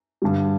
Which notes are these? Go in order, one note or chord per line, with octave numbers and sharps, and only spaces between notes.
G2 D3 G3